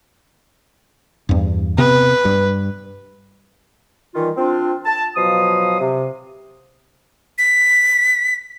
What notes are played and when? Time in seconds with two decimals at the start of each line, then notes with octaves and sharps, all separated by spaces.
1.29 E2 G2
1.78 C3 B3 B4
2.25 G2
4.15 D#3 E3 G3 F4
4.37 C4 D4 F4
4.85 A5
5.16 B2 F3 F#3 F5 D#6
5.80 C3
7.38 B6